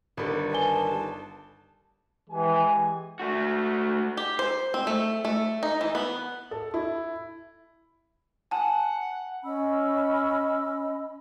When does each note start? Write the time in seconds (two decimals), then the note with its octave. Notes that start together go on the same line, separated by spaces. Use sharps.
0.17 G1 D#3 G3 D4 A4 B5
0.53 B4 G#5 A5 G7
2.30 E3 G#3 G4 G#5
3.20 A3 F#4
4.17 G4
4.39 C5
4.74 C4
4.87 A3
5.25 A3
5.63 D#4
5.81 E3
5.95 B3
6.51 A4
6.74 E4
8.51 F#5 G#5 A5
9.45 C#4 D#5 B5 E6